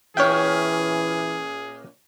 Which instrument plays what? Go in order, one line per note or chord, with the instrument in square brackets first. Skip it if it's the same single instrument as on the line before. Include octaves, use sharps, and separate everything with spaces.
[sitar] A#2 C#4 E5 [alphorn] E3 [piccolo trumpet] G#4 [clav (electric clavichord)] C#5 G5